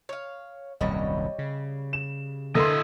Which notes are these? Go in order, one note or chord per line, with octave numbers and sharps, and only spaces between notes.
C#5 F5
D#1 C2 F#2 G3 C#5 D#5
C#3
E7
D3 A3 B3 E4 A#4 D#5 C6